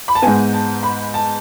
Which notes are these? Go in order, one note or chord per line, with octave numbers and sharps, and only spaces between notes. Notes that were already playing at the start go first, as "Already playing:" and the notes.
B5
A5
G#2 G#3 B3 G#5
A5
B5
A5